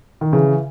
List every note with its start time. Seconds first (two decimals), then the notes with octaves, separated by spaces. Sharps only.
0.21 D#3
0.33 C#3 E3